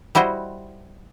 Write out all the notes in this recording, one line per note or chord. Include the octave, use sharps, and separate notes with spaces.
G3 E4 F#4 C5 D#5